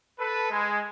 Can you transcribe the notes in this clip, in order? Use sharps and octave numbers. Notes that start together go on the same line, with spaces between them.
A4 B4
G#3